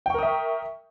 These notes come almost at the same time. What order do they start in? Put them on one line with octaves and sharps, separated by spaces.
G5 C#6 A#4 D#6 E5